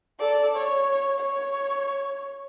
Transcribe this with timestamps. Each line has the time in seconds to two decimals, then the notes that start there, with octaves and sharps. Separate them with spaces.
0.19 A4 D5
0.56 C#5
1.19 C#5